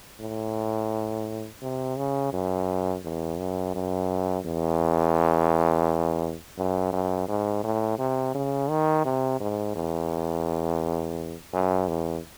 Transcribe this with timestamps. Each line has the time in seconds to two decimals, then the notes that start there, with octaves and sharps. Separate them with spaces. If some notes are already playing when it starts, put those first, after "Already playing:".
0.21 A2
1.63 C3
1.97 C#3
2.33 F#2
3.04 E2
3.39 F#2
3.75 F#2
4.45 E2
6.58 F#2
6.93 F#2
7.28 G#2
7.64 A2
7.99 C3
8.35 C#3
8.70 D#3
9.05 C3
9.41 G#2
9.76 E2
11.53 F#2
11.88 E2